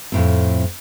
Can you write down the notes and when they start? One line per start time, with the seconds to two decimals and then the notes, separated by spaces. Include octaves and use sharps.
0.12 F2 A2 C4